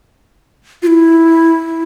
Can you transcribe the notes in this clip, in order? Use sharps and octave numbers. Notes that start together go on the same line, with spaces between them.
F4
E4